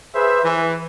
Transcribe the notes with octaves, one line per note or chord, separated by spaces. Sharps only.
G#4 B4 C5 E5
E3